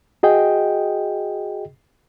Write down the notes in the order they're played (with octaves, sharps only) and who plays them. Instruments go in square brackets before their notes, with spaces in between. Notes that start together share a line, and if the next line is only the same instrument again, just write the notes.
[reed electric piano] F#4 G#4 D#5 G5